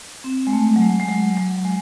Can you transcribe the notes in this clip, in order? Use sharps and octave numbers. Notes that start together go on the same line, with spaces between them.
C4
G#3
A3
F#3
G#3
G#3
F#3
F#3
F#3
G#3